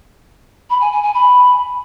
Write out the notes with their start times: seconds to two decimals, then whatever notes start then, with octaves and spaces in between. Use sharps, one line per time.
0.70 B5
0.81 G#5
0.92 G#5
1.03 G#5
1.14 B5